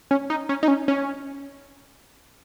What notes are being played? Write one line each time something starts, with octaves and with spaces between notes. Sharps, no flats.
C#4
D#4
C#4
D#4
C#4
C#4